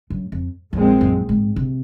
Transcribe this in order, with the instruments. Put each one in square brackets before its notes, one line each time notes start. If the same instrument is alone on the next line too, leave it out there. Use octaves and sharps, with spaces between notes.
[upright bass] F#2
F2
[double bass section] A#1 A#2 G#3 C4 [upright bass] F2
[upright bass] F#2
G#2
C3